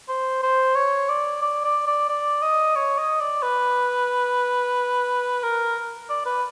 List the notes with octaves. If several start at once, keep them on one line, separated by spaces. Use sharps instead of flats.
C5
C5
C#5
D5
D5
D5
D5
D5
D#5
C#5
D#5
D5
B4
A#4
D5
B4